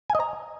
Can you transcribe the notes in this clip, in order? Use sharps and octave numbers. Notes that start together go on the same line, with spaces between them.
G#5
D#5
A#5